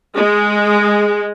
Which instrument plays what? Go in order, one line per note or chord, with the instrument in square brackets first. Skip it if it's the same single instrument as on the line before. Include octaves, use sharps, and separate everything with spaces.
[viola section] G#3